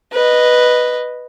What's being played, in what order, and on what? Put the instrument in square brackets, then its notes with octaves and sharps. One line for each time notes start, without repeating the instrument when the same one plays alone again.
[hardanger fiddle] B4 D#5